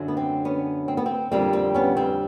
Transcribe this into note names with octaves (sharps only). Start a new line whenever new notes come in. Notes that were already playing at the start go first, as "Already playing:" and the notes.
Already playing: F#2 D3 F#3
B3
C4
B3 C#4
C4
B3
C4
F2 D3 G3 A#3 C4
C4
B3 C#4
C4